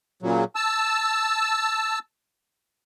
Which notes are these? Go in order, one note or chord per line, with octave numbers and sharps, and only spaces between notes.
A#2 C#3 F#3
A5 E6